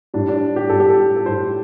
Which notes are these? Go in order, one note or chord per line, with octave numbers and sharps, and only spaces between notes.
A2 G3 D4
D4
G4
A2 G3 A4
G4
A4
A4
A2 G3 C5